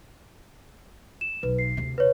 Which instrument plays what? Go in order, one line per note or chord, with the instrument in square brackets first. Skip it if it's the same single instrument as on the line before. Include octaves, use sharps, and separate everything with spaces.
[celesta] E7
[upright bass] B1 [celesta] B4
[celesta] C7
[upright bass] D2 C3
[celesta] B4 C#5